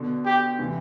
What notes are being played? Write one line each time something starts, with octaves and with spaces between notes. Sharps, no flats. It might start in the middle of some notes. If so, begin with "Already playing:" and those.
Already playing: B2 D3
G4
C3 E3